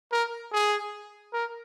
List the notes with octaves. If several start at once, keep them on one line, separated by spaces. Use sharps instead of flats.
A#4
G#4
A#4